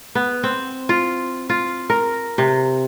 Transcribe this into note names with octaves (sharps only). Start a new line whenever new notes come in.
B3
C4
F4
F4
A#4
C3